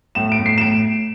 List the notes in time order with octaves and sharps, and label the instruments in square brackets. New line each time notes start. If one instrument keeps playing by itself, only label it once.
[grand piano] A2 E7
D7
A2
C7
E7
A2 D7